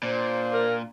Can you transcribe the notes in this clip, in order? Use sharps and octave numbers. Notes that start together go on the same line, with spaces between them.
A#2 D4 C5
A#4